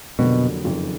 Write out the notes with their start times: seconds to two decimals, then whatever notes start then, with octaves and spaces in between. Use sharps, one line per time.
0.19 F1 F2 B2 D3 F#3 A#3
0.64 F#1 F2 D#3